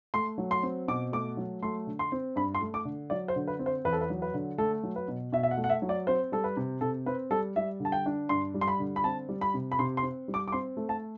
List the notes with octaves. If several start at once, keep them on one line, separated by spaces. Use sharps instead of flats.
A3 C6
F#3
C6
C4
B2 D6
A3 D6
F#3
A3 C6
D3
C6
C4
G2 B5
C6
A3
D6
D3
F#3 D5
C5
D3
B4
C4
C5
E2 B4
A4
B4
F#3
B4
D3
A3 A4
F#3
B4
B2
B2 E5
E5
F#5
A3
F#5
E5
F#3
D5
C4 C5
G3 A4
B4
C3
C3 A4
C4 B4
G3 A4
G3 E5
D3
A5
G5
D4
G2 C6
G3
C6
B5
D3
B5
C4 A5
G3
B5
C3
B5
C3 C6
C6
C4
G3
D6
D6
C4 C6
A3
A5